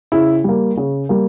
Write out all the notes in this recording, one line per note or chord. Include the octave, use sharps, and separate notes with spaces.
C#3 E4
G3 A#3
C#3
G3 A#3